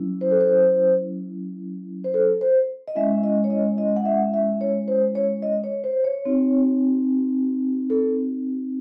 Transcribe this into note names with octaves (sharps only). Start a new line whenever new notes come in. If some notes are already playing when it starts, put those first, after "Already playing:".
Already playing: F#3 C#4 E4
C5
A4
C5
C5
A4
C5
D#5
G#3 C#4 E4 E5
D#5
C#5
D#5
D#5
F#5
E5
E5
C#5
C5
C#5
D#5
C#5
C5
C#5
C4 D#4 F#4
A4